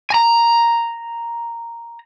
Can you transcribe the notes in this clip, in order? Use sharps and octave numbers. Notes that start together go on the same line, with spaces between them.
G#5 A#5